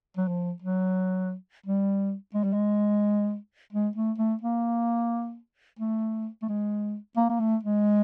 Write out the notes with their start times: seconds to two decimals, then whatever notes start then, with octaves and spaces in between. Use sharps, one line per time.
0.17 F#3
0.28 F3
0.62 F#3
1.66 G3
2.34 G#3
2.44 G3
2.53 G#3
3.73 G#3
3.96 A3
4.18 A3
4.41 A#3
5.79 A3
6.42 A3
6.49 G#3
7.17 A#3
7.29 A#3
7.40 A3
7.63 G#3